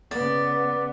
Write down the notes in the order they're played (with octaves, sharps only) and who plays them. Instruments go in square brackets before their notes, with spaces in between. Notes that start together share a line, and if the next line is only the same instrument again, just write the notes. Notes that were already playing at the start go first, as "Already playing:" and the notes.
[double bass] C#3 B3 [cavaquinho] D5